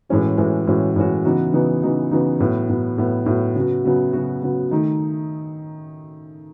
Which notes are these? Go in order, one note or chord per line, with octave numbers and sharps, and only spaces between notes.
A2 E3 G#3 C#4 F#4
A2 E3 G#3 C#4 F#4
A2 E3 G#3 C#4 F#4
A2 E3 G#3 C#4 F#4
C#3 E3 B3 D#4 F#4
C#3 E3 B3 D#4 F#4
C#3 E3 B3 D#4 F#4
C#3 E3 B3 D#4 F#4
A2 F#3 B3
A2 F#3 B3
A2 F#3 B3
A2 F#3 B3
C#3 F#3 B3 F#4
C#3 F#3 B3 F#4
C#3 F#3 B3 F#4
C#3 F#3 B3 F#4
D#3 A3 D#4